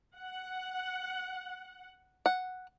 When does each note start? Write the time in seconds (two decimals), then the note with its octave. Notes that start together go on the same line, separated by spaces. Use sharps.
0.16 F#5
2.26 F#5